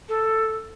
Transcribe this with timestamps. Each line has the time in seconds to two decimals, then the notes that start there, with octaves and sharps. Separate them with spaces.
0.08 A4